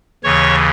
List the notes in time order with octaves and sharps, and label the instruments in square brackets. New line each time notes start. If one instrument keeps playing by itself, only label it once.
[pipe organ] D#2 C#3 E3 C#5 C#6